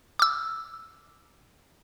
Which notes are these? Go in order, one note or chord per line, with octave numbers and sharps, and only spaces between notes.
D6 E6